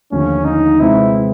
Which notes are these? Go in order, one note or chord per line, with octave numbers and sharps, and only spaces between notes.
D#2 D3 F3 A3 C#4
D#4
C3 E3 G#3 C4 E4